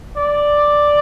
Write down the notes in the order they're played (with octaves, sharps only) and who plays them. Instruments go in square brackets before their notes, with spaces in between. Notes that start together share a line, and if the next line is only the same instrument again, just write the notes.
[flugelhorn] D5